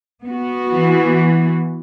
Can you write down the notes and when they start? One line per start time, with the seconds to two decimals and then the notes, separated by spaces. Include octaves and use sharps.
0.25 B3 F#4
0.72 E3